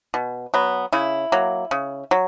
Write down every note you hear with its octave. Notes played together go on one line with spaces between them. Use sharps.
B2
F#3 B3
C#3 E4
F#3 A#3
C#3
F#3